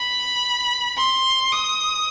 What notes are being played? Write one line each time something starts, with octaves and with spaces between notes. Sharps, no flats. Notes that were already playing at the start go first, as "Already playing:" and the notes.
Already playing: B5
C6
D#6